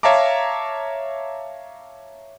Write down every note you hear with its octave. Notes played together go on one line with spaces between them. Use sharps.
C#5 E5 F5 A5 A#5 D6